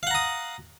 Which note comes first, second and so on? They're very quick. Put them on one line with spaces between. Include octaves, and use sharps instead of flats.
F5 F#5 A#5 D#6